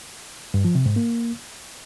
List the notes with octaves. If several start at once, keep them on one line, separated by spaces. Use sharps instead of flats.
G2
F3
C3
G#2
A#3